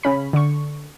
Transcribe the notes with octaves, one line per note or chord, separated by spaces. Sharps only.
C#3 C#4 B5
D3 C#6